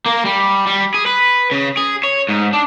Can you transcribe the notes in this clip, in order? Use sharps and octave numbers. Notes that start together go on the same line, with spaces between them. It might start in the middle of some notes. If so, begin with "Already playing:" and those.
A#3
G3
G3
G#4
B4
C#3
G#4
C#5
G#2
D4